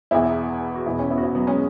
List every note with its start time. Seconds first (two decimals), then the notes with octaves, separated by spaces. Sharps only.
0.11 E1 E2 E3 B3 E4
0.75 F#4
0.86 E1 E2 B2 B3 E4
0.99 C#4
1.10 B3 E4
1.18 F#4
1.22 B3 E4
1.35 F#3 B3
1.47 G#3 C#4